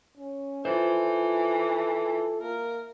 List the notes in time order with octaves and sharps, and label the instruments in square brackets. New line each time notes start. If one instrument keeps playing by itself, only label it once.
[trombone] C#4
[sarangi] E3 [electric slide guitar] F4 C5 [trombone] A4
[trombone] A#3 [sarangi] A#4